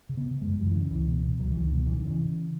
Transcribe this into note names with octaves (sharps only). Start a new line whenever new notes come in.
C#3
B3
C#3
F#2 G#3
F#2 F#3
E3
C#3
D#3
C#2 E3
B2
B2
C#2 F#3
C#2 E3
D#3
B2 F#3
E2 E3
D#3
C#3 E3
C#3